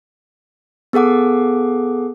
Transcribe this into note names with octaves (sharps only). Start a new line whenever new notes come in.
B3 G#4 A4 F#5 D6